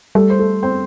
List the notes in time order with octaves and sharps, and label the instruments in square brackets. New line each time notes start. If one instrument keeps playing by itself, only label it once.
[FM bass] G3 [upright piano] A3 A4
[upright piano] C5
A3 A4
C4 C5